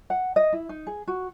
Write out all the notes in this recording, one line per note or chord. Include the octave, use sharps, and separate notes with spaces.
F#5
D#5
E4
D#4
G#4
F#4